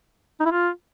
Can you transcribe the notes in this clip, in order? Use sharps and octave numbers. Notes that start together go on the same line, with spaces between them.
D#4
E4
F4